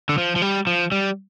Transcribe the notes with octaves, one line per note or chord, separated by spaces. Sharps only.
D3
F3
F3
G3
F3
G3